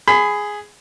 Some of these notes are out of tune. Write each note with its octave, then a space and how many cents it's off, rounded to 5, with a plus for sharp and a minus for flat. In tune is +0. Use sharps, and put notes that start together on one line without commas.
G#4 +0 B5 +30